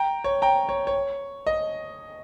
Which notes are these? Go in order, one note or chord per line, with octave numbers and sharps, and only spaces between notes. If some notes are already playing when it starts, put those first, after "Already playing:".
Already playing: G5 A#5
C#5
G5 A#5
C#5
C#5
D#5